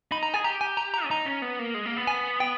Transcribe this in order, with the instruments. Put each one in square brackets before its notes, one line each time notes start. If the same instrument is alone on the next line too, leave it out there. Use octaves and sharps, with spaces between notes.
[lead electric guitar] D#4 [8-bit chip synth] B5
[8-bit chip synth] A#5
[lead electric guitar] G#4 [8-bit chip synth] G#5
[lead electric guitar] G4 [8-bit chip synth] A#5
[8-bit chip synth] G#5
A#5
A#5
[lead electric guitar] C#4
[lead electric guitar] D#4 [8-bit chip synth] A#5
[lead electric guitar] C#4
B3
A#3
G#3
A#3
B3
[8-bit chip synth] G#5
G5